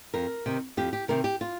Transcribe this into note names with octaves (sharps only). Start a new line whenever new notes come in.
F2 A#4
C3 D#3
F2 G4
G4
C3 D#3 A#4
G4
F4